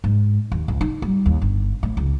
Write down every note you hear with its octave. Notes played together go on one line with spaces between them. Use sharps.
G#2
D#2
C#2
D#4
G3
D#2
G1
A2
C#2